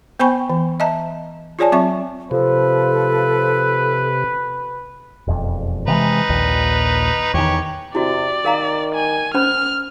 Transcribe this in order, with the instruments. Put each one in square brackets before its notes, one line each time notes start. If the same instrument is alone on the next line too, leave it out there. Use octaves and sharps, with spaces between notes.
[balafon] B3 C5 G5 G#5 B5 C#6
E3
D#5 E5 A5 A#5
F4 G#4 C#5 D5 G#5 A5
F#3 C4 E5 A5 C#6
[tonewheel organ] C3 [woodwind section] F3 [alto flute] A4 [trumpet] B4
[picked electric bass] E1 F2
[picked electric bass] C3 E3 G#3 [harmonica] D#4 B4
[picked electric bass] A#1 D#2 A#2
[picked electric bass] E2 D#3 [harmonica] G4 C#5
[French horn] C3 [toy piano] E4 F#4 [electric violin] D5
[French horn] D#3 [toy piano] A#4 F5 A#5
[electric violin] G#5
[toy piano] C#4 C5 B5 [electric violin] F6